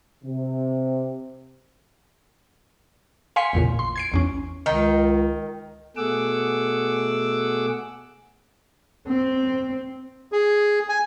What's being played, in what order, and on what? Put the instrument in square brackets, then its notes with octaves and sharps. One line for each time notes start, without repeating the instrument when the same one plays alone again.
[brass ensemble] C3
[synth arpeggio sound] F5 G#5 C6 B6 C#7
A1 E2 A#2 C#3
C6
G#6 C7 D7
A1 E2 C#4
[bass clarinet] C#2 [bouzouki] D#3
[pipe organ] B2 A3 G#4 F#5 D6 E6
[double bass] C4
[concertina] G#4
G#5